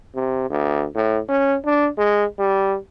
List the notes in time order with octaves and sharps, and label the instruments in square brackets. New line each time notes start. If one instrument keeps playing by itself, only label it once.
[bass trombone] C3
D2
A2
C#4
D4
G#3
G3